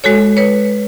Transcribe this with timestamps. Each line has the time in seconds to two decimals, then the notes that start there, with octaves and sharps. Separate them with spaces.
0.04 G#3 F#4 A4 C#5
0.37 B4 C#5